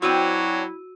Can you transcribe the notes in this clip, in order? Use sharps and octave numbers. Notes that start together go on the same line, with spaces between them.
F#3 C4 D4 E4 F#4 C#5 E6 D#7